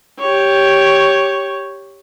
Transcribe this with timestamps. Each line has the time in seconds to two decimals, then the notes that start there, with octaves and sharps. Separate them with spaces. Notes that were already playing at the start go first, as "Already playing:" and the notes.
0.19 G4 C#5